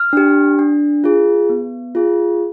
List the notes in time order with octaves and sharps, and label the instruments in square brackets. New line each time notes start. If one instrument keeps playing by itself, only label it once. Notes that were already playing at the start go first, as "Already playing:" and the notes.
Already playing: [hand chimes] F6
D4 G4
D4
F4 G#4
B3
F4 G#4